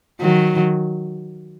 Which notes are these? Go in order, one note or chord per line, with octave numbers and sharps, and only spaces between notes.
D#3 F#3